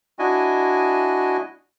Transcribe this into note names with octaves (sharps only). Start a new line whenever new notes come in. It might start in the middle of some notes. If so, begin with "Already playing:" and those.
D4 E4 F#4 D#5 G#5